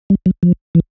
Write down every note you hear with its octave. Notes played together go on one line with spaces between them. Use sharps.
G3
F#3
F3
E3